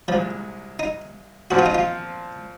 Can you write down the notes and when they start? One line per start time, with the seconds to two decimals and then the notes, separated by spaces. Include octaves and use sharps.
0.08 C2 A#2 F3 G#3
0.79 D#4
1.51 A#2 F3 C4 F#4
1.59 F4
1.66 D#4
1.75 F4